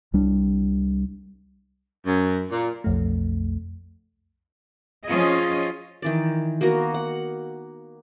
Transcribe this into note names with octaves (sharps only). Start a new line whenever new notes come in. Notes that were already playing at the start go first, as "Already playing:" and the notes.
C2 G3 D4
F#2
A#2
B1 F2 A3
F3 C#4 F4 G#4 D#5
D#3 E3 D5
A#3 B3 F#4 A#4
F#5